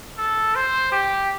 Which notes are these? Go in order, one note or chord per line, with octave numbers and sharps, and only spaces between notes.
A4
C5
G4